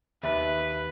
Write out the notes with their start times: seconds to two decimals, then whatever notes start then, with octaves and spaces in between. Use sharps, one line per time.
0.23 D#2 B4 E5